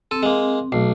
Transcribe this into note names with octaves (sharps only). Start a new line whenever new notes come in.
C4 A4
G#3 A#3
B1 A3